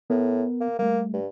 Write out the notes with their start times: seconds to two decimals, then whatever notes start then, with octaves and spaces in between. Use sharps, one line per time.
0.10 A2 B3 A#4
0.61 A#3
0.79 G3 A3 A#3
1.13 G2